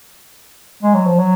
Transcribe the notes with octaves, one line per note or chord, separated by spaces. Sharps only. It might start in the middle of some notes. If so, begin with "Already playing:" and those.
G#3
F#3
F3
F#3